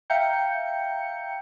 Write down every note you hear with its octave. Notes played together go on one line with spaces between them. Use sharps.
E5 F5 G5 A#5 G6 C#7